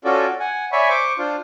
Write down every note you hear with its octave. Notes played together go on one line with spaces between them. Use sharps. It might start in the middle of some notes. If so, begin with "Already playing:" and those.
C#4 F4 F#4 A4 D5
F#5 G#5
C#5 D5 E5 G#5 B5 C#6
C5 C#6 D6
D4 F4 C5